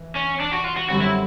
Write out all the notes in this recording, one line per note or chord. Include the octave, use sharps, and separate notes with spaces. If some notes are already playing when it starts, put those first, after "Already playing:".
Already playing: E3
C#4
D4
F#4
F4
F#4
F#2 D3 G3 C4 F#4
E4